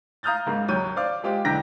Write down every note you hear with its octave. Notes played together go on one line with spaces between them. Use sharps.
F5 A#5 D#6 F6 G6 A6
G#2 C#3 A#3
D#2 F#3 C#5 G6 D#7
C5 D5 F5 D6
G#3 F4 G4 C5
B1 E2 D3 G5 A#6 B6